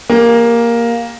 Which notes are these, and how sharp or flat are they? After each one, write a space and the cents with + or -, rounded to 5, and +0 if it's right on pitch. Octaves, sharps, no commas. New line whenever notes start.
A#3 +5 G4 +40